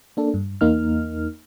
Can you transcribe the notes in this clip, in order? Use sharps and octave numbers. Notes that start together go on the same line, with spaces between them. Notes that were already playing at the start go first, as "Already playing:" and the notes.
A#3 D4 A4
G2
E2 A#3 D#4 F6